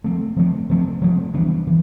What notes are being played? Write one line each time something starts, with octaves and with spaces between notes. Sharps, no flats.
F3 A3 C4
F3 A3 C4
F3 A3 C4
F3 A3 C4
E3 G3 B3 D4
E3